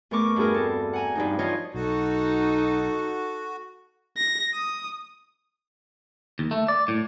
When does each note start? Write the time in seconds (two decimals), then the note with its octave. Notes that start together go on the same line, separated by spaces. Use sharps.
0.11 E2 A3 A#4 C#6 D6
0.36 G2 D4 F#4 G#4 A#4
0.54 C4 A4
0.93 F#5 G#5 A#5
1.15 G2 F3 D#4
1.39 E3 F3 D#4 F4 C#5 D#5
1.74 B1 D#4 F#4 A4
4.17 A#6
4.54 D#6
6.39 D#2
6.51 A3
6.68 D5
6.88 A2